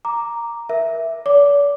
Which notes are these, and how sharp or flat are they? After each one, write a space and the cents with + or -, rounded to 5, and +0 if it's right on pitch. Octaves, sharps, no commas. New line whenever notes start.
A#5 +0 D6 +0
A#4 +30 E5 +0
D5 -45 D6 +0